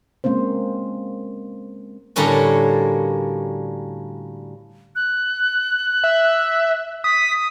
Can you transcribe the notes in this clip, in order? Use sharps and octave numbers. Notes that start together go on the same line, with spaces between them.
G#3 A#3 C4 C#4 C5
A2 D3 G3 A#3 C#4 F#4
F#6
E5
D#6 B6